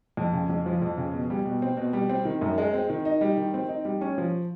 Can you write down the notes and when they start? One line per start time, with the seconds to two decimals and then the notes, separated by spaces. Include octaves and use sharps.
0.17 F2
0.33 C#3
0.50 F2
0.66 F3
0.82 F2
0.97 C#3
1.13 B2
1.30 G3
1.45 B2
1.62 C4
1.77 B2
1.93 G3
2.09 C4
2.25 D#3
2.41 F#2
2.58 G#3
2.73 C4
2.89 D#3
3.05 D#4
3.21 G3
3.37 D#3
3.54 C4
3.69 D#4
3.85 G3
4.01 C#4
4.18 F3